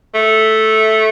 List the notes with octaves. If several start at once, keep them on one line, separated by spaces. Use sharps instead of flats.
A3